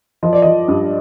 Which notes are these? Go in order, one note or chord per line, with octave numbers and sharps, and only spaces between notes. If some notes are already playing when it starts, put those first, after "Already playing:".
F3 D#5
D5
F3 D#5
G2